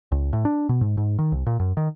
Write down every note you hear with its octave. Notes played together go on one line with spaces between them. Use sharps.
C#2
A2
D4
B2
G#2
G#2
D#3
C2
A#2
F#2
D#3